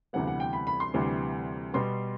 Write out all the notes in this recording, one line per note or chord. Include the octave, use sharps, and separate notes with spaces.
D2 C3 E3 G3 B3 F#5
F#5
G5
B5
B5
C6
D2 C3 E3 G3
B2 G3 B3 C6